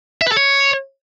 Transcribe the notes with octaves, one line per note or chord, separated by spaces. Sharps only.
E5
B4
A4
C#5